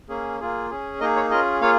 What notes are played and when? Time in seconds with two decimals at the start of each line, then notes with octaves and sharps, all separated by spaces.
0.09 A#3 C#4 G#4
0.40 A#3 F4 G#4
0.70 C#4 G#4
1.00 A#3 D#4 G#4 A#4 D#5
1.16 C#5
1.30 C#4 F4 G#4 A#4 D#5
1.61 A#3 F4 G#4 C#5 F5